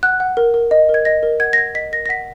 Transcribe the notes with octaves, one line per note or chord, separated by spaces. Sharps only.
F#5 F#6
F#5
A#4
A#4
D#5
A#4
G#6
D#5 A#6
A#4
F#5 G#6
A#6
F#5 G#6
D#5 B6
A#4 A#6
A#6
F#5 B6